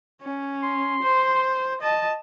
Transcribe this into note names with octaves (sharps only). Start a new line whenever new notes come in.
C#4
C6
C5
D#5 A5